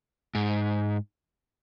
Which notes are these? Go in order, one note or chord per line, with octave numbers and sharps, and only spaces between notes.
G#2